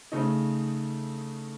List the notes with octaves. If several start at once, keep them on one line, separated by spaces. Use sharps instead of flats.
C#3 A3 D#4